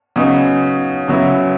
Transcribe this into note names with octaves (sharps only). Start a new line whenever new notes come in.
C#3 F#3 B3 D#4
C#3 F#3 B3 E4